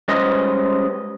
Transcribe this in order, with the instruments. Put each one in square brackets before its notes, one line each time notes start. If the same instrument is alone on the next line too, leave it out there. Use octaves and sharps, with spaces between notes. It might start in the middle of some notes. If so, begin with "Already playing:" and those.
[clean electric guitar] G3 G#3 C#4 B4 C5 D#5